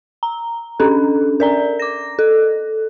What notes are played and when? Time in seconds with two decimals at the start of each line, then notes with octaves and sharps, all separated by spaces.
0.23 A#5
0.80 C#4 D4 A4
1.40 A#4 D5 A#5
1.79 D6 A#6
2.19 A4